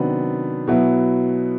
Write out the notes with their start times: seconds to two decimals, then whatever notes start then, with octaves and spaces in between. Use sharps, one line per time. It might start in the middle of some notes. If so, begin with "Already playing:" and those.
Already playing: C3 D#3 F#3 B3 D4
0.67 B2 F#3 B3 E4